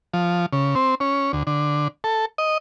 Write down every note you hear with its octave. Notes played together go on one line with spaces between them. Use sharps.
F3
C#3
C4
C#4
D2
D3
A4
D#5